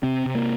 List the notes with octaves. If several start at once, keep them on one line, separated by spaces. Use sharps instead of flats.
C3 C4
C3
A#3